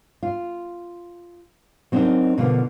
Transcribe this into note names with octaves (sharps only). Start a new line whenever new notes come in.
F4
F#3 C4 D4 D#4 A#4 D#5
B2 D3 F3 A#3